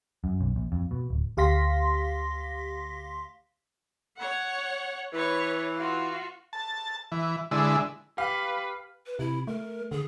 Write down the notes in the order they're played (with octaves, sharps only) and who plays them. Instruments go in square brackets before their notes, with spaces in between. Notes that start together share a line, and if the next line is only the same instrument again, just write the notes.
[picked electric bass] F#2
B1
A#1
F2
B2
D1
[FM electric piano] D2 G4 F5 C6 A#6 B6
[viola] C#5 F#5
[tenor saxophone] E3 [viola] B4 C#5
[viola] F4 F#4
[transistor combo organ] A5
E3
D3 G#3 E4
[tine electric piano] G4 [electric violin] B4 [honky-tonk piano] F5
[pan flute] B4
[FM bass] C3 [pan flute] E4
[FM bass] A3 [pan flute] A#4
[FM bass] D3 [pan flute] G#4